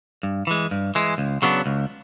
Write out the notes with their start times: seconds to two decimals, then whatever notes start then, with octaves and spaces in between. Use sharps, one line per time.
0.23 G2
0.47 E3 G#3
0.71 G2
0.95 E3 G#3
1.18 C#2
1.42 C#3 F#3 B3 D4
1.66 C#2